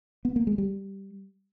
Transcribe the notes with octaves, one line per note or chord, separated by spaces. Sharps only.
B3
A#3
G#3
G3